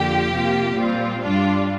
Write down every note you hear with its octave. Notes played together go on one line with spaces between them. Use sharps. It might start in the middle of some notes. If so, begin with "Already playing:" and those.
Already playing: F2 D3 A#3 F4 G4
C3 A#3 F4
A#2 G3 C4 F4
G2 G3 D4 F4